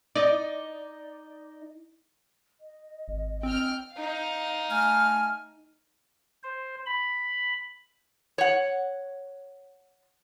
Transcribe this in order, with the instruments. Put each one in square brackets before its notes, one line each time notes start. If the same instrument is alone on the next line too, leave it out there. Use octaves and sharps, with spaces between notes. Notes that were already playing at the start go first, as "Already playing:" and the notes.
[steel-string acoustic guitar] D#4 [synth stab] D5 D#5
[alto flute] D#5
[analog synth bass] G#1
[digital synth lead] C4 [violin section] G5 F6
[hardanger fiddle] D#4 F5
[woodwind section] A3 G#5 F6
[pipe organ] C5
B5
[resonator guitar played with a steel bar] C#5 F#5